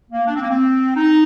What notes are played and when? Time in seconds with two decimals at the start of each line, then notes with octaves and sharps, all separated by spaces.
0.11 A#3
0.27 D4
0.35 C4
0.42 A#3
0.49 C4
0.96 D#4